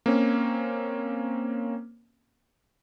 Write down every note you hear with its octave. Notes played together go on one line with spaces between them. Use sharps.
A#3 C4 C#4